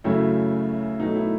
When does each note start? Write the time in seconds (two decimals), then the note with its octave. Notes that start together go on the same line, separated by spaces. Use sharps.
0.04 F#2 C#3 F#3 A3 E4
1.00 B2 F#3 A3 D#4
1.16 E4